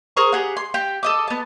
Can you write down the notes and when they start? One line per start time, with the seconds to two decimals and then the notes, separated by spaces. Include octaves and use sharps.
0.17 G#4 A#4 C5 C#6
0.32 G4 G#4 F#5
0.57 C6
0.74 G4 G5
1.03 A4 D#5 D6
1.28 B3 A5